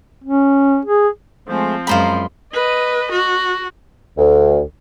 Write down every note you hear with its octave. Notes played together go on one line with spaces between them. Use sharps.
C#4
G#4
F3 G#3 A3 C4 C5
F#2 G#3 F4 C5 A#5 B5
B4 D#5
F#4
D2